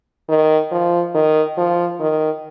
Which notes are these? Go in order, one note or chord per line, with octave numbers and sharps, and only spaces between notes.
D#3
F3
D#3
F3
D#3